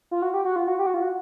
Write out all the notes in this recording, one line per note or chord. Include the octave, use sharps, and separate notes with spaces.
F4
F#4
G4
F#4
F4
F#4
G4
F#4
F4
F#4